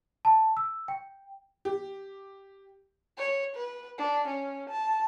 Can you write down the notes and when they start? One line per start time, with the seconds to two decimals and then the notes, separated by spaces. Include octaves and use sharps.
0.25 A5
0.57 E6
0.88 G5
1.65 G4
3.18 C#5
3.56 B4
3.98 D4
4.28 C#4
4.70 A5